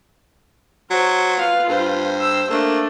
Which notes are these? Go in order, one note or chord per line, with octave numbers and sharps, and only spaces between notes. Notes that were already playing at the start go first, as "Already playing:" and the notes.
F#3 C5 C#6
F4 B4 F5
G2 C5
E6
A3 A#3 D4